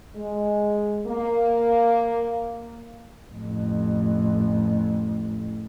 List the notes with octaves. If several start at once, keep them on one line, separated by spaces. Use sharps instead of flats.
G#3
A#3
A1 F2